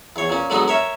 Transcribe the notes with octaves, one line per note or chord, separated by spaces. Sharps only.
E2 C#5
A#2 C#4
G#2 D3 F#3 B3 D#4
A#4 C#5 E5